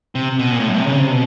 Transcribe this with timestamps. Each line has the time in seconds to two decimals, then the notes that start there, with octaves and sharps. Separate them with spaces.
0.15 C3
0.39 B2
0.51 A#2
0.60 A2
0.69 F#2
0.78 C3
0.87 C#3
0.99 C3
1.11 B2